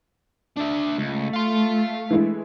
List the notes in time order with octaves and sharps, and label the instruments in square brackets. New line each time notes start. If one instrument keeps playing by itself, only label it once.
[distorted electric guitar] D4 E5
[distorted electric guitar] C#2 [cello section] A3
[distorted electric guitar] F5 C6
[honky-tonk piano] E3 G#3 E4